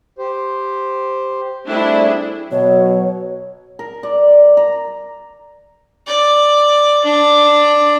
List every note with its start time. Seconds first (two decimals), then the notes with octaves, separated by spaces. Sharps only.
0.18 G4 C5
1.67 G3 A3 C4 D4 E4 G#4
2.51 B2 F#3 C#5
3.79 A#4
4.03 D5
4.57 A#5
6.07 D5
7.04 D4